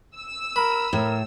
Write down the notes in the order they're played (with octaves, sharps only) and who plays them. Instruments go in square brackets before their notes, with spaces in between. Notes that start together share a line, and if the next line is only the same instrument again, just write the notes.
[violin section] E6
[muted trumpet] A#4 [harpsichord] B5
[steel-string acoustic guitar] A2 [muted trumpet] A#4